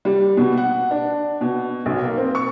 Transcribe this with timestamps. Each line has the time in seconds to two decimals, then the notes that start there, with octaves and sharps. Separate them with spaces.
0.05 G3
0.37 B2
0.57 F#5
0.91 D4
1.41 B2
1.86 B1
2.04 A#3
2.17 C4
2.35 C#6